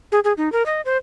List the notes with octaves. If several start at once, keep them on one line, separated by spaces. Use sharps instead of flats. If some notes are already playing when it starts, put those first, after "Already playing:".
G#4
G#4
D#4
A#4
D#5
C5